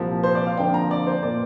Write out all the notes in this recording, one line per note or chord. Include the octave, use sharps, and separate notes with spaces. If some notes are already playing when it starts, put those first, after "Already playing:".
Already playing: C2 A#2 F3 A#3
C5
D5
F5
F2 D3 F3 A#3 G5
A#5
D5
C5
A#2 A#3 D5